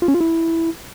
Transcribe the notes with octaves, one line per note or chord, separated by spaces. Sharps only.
F4
C#4
F4
E4